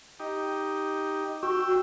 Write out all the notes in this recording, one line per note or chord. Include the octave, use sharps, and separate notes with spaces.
D#4 G4
F#4 G5 E6